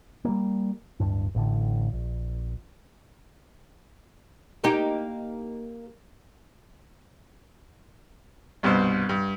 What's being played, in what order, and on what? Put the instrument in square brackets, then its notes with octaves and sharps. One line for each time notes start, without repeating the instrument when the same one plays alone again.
[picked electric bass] G3 G#3 A#3
D1 G2 D4
A1 A2 D3
A#1
[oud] A#3 D#4 G4
[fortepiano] C2 G2 B2 B4 C5
G2